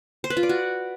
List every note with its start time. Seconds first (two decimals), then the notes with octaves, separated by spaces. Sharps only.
0.24 C5
0.30 B4
0.37 F4
0.43 D5
0.49 F#4